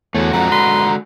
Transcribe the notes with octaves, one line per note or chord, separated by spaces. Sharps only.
E2 A3 F#4 C#5
F2 D3 G#3 F#4 F#5 A#5
B4 C6